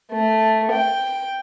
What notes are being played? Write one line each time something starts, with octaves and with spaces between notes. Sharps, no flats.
A3
G5